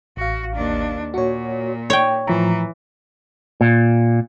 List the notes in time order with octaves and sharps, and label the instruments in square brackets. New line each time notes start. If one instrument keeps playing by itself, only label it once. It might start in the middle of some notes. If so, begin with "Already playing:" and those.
[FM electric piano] A1 F5 [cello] F#4
[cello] D#2 D4
[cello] A#2 [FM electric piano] F#4 C#5
[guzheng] C#5 G5 [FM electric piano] D5
[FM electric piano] A2 F3 A#5 [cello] E3
[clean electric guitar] A#2